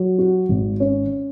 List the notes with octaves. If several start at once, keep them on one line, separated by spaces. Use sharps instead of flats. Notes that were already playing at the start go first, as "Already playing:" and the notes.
Already playing: F#3
F#4
G#1
C#4